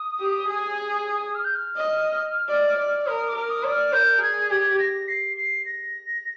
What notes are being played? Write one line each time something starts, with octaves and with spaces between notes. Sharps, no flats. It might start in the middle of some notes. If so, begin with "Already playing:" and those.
Already playing: D#6
G4
G#4
F6
G6
F6
D#5
D5
D5
A#4 D#6
D6
A#4
D#6
D5
F6
A#4 G6
G#4 G#6
G4 G#6
A#6
C7
C7
A#6